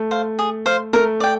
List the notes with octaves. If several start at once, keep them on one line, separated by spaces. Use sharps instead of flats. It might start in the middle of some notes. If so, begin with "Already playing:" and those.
Already playing: A3
C5 F5
G#4
C5 F5
A3 A#4
D5 G5